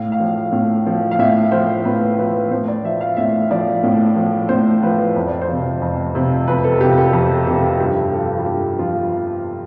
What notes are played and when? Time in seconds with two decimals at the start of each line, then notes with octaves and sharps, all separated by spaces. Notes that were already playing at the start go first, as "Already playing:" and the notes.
Already playing: A2 F5
0.12 F5
0.20 F3
0.52 A2
0.87 F3
1.11 F5
1.19 A2 E5
1.51 F3 C5
1.85 A2 B4
2.19 F3 B4
2.51 A2 C5
2.68 D5
2.84 F3 E5
3.01 F5
3.17 A2 E5
3.51 F3 D5
3.83 A2
4.16 F3
4.49 A2 C5
4.83 F3 B4
5.15 F2 C5
5.28 D5
5.41 C5
5.48 C3 F3
5.82 F2
6.15 C3 F3
6.48 F2 B4
6.64 A4
6.80 C3 F3 G4
6.97 A4
7.13 F2 G4
7.47 C3 F3 G4
7.80 G2 G4
8.12 F3 A4
8.38 F4
8.46 G2 G4
8.79 F3 F4